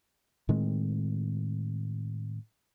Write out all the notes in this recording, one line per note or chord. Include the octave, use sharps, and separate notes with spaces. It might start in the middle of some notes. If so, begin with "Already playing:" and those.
A2 D#3 G#3 C4